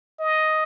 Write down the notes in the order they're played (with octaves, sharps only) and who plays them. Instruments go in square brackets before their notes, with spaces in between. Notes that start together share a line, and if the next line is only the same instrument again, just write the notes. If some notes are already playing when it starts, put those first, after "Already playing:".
[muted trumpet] D#5